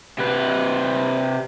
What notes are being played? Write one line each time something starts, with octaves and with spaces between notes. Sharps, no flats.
C3 B4